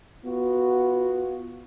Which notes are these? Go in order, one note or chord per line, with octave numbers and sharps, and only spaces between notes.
B3 F4 F#4